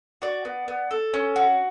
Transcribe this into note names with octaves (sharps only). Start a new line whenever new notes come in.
F#4 D5
B3
B3
A4
C#4
F#4